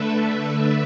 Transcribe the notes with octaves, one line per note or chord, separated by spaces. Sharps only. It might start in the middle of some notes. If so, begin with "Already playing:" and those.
Already playing: D3 A3 D4 A4 B4 E5
B4